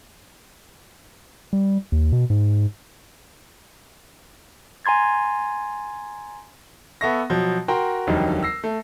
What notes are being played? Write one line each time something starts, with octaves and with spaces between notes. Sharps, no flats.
G3
D#2
B2
G#2
G#5 A#5 C6 G#6 A6
B3 A4 E5 C#6 A#6
B2 F3 F#3
F#4 A#4 G5 C6
F1 D#2 D3 F#3 G3 D#4
E6 A#6 C7
A3